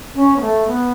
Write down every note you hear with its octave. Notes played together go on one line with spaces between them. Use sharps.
C#4
B3
A3
B3